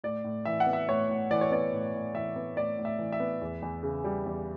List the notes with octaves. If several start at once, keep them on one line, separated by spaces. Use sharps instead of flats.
A2 D5
A2
E3 E5
F#5
B3
E5
A2 C#5
A2
E3 D5
C#5
B3 D5
A2
A2
E3 E5
B3
A2 D5
A2
E5
E3
E5
B3
E2
E2
C#3
G3
E2